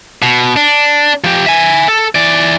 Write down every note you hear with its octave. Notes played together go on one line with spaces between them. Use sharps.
B2
D4
F3 G4
E5 G#5
A4
E3 D5